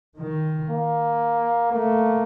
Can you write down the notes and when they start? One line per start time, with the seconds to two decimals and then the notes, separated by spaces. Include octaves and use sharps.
0.18 D#3
0.70 A#3
1.72 A3 A#3